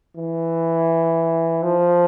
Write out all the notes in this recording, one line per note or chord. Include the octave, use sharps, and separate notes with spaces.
E3
F3